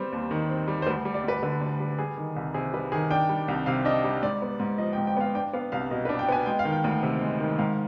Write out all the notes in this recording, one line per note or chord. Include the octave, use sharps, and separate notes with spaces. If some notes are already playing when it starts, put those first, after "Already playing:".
Already playing: G3 B3 C4 C5
D#2
D#3
C4
G3
C5
D2 B4
G3
D5
D2 B4
D3 B4
D2
G3
G3 G#4
D#3
C2
C3 G#4
G3 B4
D#3 G#4
D4 G5
G3
C2
C3 F5
D4 D#5
G3
G#2 D5
B3
G#2
F3 D#5
G5
G#2
G5
B3 F5
D4 G5
B3 F5
C2 F5
B2 D#5
B4
D4
G5
B3 G#5
G#3 G5
F5
D#3
G5
D2
C3
G#3
D#3
G#2 F5